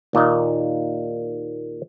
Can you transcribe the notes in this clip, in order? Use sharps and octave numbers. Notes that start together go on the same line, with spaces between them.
D#2 A#2 A#3 D#4